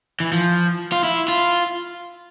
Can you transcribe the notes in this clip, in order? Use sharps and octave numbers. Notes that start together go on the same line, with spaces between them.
E3
F3
F4
E4
F4